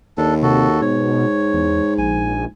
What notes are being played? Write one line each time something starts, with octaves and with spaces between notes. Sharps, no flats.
D#2 D4 A4
C3 F#4 A4
G#2 B2 C#5
E2
A#1 G#5